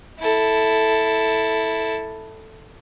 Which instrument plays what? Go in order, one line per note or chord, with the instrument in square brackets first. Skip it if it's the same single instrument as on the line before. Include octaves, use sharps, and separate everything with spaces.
[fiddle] E4 A4